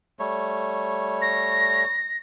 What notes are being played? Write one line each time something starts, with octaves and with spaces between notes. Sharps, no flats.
G3 A3 C#5
A#6